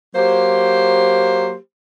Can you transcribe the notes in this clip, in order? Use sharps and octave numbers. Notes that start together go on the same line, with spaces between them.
F#3 A#3 G4 C5